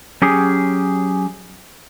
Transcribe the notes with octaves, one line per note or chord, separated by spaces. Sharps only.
F#3 C#4 G4 G#4